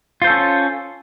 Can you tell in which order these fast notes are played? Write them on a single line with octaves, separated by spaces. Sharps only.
F4 C5 A4 C#4